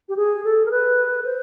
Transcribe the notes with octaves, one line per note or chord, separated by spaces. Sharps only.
G4
G#4
A4
A#4
B4
C5